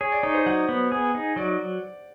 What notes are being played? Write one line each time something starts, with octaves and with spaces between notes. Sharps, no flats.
G#4 C#5
D5
D#4 C#5
C5
F#3 F#5
B3
G#4
D#4
F#3 D5